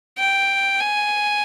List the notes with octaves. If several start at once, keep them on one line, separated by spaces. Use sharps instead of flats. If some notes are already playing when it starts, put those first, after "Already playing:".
G5
G#5